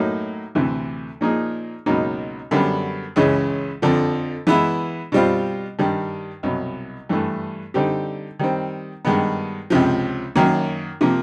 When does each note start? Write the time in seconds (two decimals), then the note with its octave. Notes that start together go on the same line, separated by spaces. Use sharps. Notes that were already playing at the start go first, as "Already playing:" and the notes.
Already playing: A2 F#3 A#3 D#4
0.55 D2 C3 E3
1.21 A#2 F3 A#3 D#4 G#4
1.86 C#2 B2 F#3 A#3 D#4
2.51 F#2 D3 G3 B3
3.16 C#2 C#3 E3 G#3 C#4
3.82 F2 D3 F3
4.47 E3 G#3 B3 E4
5.12 B2 G3 C4 F4
5.79 G2 D#3 G3
6.43 C2 B2 F#3
7.09 G2 E3 A3
7.74 D3 G3 C4 D#4 G4
8.39 D#3 G3 C4
9.05 G2 D#3 G#3 B3
9.70 C#2 C3 F3
10.36 F#2 D#3 F#3 A#3
11.01 C3 F3 A#3